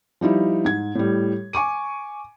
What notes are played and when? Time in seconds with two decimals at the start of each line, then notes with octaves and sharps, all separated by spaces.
0.21 F3 G3 D#4 E4
0.65 G#2 G#6
0.95 A2 G3
1.53 G#5 C#6 D6 D#7